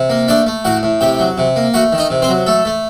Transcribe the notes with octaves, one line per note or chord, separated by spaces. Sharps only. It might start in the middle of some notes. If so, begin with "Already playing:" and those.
Already playing: C3
A#3
A3 D4 D5
A3
A2 F#4 F#5
A2
C3 G4 G5
F#3
C3
A#3
A3 F#4 F#5
D#3
D#4 D#5
C3
C4 C5
F#3
A3 A4
A3